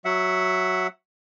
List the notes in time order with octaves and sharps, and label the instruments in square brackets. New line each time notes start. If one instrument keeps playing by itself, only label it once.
[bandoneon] F#3 E5 F#5